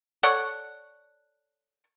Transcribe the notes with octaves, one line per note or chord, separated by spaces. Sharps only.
A4 C#5 D5 F#5